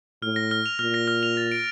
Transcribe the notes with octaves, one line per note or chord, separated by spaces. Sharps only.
A2 F6
A#6
F6
F7
A#2 F6
A#6
F6
F7
A6
D7